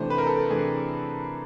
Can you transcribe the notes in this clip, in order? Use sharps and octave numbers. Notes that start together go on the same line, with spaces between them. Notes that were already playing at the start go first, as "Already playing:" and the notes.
Already playing: C3 E3 A3 D4 C5
B4
A#4
A4
C3 E3 A3 D4 G#4